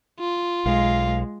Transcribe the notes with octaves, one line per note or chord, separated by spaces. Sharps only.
F4
B1 G#3 F5